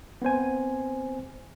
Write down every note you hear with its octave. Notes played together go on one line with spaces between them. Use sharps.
B3 C4 C5 G#5